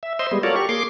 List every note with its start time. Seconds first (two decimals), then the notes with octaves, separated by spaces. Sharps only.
0.03 E5
0.19 C5 D#5 E5 C6
0.31 G3 G#3 B3
0.43 F4 F#4 A4 A#4 C#5 D5
0.56 G4 C#6
0.69 A#3 G#4 C6 D6